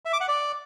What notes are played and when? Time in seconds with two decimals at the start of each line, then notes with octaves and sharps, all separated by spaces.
0.05 E5
0.13 D6
0.21 F#5
0.28 D5